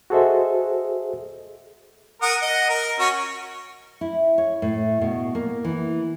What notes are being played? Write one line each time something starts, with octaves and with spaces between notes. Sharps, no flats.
F#4 G#4 A4 C5 D#5 E5
A#4 F#5 D#6
D#5 F#5
A#4
C#4 F#4
E4
C#5
A2
B2
A#3
E3